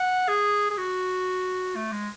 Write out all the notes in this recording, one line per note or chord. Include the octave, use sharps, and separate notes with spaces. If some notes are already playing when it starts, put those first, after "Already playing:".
Already playing: F#5
G#4
G#4
F#4
A3
G#3